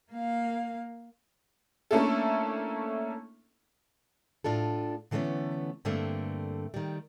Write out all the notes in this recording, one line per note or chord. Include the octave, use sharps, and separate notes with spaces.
A#3 F5
A3 A#3 C#4 D4 E4 A4
A2 D4 F4 A4
D3 E3 A3 B3 C#4
G2 D3 A3 A#3 C4
D#3 G3